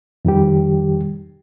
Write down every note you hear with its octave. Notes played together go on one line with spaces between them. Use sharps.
F2 D#3 G3 G4